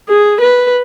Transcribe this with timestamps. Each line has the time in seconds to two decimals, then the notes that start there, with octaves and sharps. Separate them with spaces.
0.09 G#4
0.41 B4